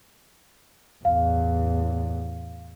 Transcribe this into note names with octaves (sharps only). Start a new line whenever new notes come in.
A1 E2 F5